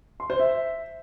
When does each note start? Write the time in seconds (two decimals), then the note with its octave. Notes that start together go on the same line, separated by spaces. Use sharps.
0.20 C6
0.30 C5
0.40 E5